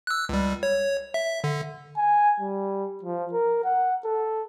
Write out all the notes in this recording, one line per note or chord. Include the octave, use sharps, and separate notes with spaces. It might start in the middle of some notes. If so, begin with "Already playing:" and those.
E6 F#6
C#2 G3
C#5
E5
D3
G#5
G3
F3
A#4
F#5
A4